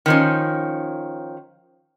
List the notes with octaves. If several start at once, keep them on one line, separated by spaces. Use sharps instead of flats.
D#3 F3 C#4